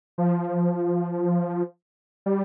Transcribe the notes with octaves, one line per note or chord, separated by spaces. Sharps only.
F3
G3